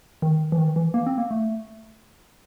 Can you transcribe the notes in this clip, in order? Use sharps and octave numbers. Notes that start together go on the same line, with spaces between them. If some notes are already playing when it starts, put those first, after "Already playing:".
D#3
E3
D#3
E3
A#3
C4
A#3
A3